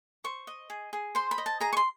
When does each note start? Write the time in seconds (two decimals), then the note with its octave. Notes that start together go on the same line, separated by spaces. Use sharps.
0.24 C5 C#6
0.47 D#5
0.70 G#4
0.93 G#4
1.15 C5 C6
1.31 B5
1.38 D#5
1.46 A5
1.60 G#4 A#5
1.73 C#6
1.77 C6